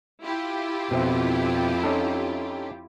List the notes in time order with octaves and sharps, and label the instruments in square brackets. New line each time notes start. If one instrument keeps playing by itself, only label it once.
[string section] E4 F4 G4
[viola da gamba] F2 [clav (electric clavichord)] B2 C4 E5
[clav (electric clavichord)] C#4 D#4 A4